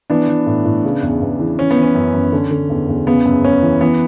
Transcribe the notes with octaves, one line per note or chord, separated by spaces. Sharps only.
E3 B3 D4
E3
A2
A2
C#3
E2
E2
E3
E3 C#4
B3
E3
C#4
F#2
F#2
D3
D3
E2
E2
C#3 B3
F#2
F#2 C#4
E3
E3 B3